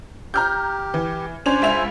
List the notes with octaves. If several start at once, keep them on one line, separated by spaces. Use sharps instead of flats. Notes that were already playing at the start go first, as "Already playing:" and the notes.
G4 A#5 F6 G6
E3
C#4 D4 C5 G#5 F7
C#2 E5 F7